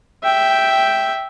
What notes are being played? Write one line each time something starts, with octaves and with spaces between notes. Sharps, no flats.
E5 G5